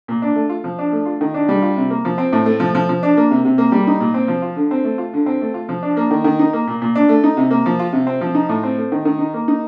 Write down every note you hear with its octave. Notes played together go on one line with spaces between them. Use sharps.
A#2
D4
A3
F4
F3
D4
A3
F4
D#3
D4
G3
F4
C3
A#3
F3
C4
A2
A3
F3
F3
F3
D4
A#3
C3
C3
A#3
G3
D#4
A#2
C4
F3
F4
D3
C4
A3
F4
D3
C4
A3
F4
F3
D4
A#3
D#3
D#3
D#4
A#3
A#2
A#2
D4
A3
D#4
C3
A#3
F3
F4
C3
C4
F3
D#4
A2
C4
A3
D#3
D#3
D#4
A#3
D#4